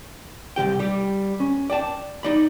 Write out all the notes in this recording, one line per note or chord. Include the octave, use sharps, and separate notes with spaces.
C2 D#3 G4 G5
G3 G4
C#4
D5 G5 A5
D#4 D5 B5